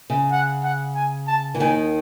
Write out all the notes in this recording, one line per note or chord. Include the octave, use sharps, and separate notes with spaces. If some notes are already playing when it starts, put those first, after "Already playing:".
C#3
F#5
F#5
G#5
A5
E3
D#2 D#3 G#5